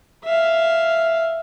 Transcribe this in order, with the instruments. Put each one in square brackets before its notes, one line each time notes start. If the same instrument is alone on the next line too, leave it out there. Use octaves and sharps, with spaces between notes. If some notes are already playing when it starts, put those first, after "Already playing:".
[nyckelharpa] E5 F5